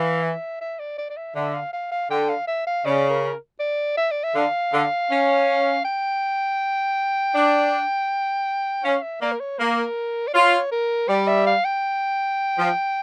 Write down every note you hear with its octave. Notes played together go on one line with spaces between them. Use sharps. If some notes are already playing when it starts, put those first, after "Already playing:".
Already playing: E3 F5
E5
E5
D5
D5
D5
E5
D3 E5
F5
F5
F5
D3 G5
F5
E5
F5
C#3 D5
A#4
D5
E5
D5
E5
D3 F5
D3
C#4
G5
D4
C#4 F5
E5
A#3 D5
A#4
C#5
A#3 A#4
D5
F4 C#5
A#4
G3 D5
E5
F5
G5
F3